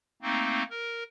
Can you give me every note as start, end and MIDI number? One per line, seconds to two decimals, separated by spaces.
0.22 0.63 57
0.22 0.63 58
0.22 0.63 60
0.22 0.63 63
0.70 1.03 70